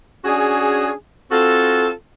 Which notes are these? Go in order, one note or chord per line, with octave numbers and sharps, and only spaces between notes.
C#4 D4 F#4 G#4
C4 F4 F#4 A4